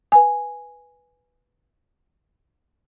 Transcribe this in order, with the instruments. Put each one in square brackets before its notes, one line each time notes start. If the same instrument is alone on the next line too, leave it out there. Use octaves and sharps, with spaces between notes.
[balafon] B4 G#5